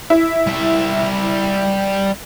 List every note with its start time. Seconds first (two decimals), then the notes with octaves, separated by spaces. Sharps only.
0.10 E4
0.47 G3 E5